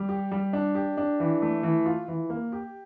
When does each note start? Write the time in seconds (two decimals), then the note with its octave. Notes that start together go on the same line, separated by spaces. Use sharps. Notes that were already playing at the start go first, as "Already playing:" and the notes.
Already playing: G3
0.09 G4
0.32 G3
0.53 D4
0.75 G4
0.97 D4
1.20 E3
1.42 A3
1.63 E3
1.86 F4
2.08 E3
2.30 A#3
2.52 G4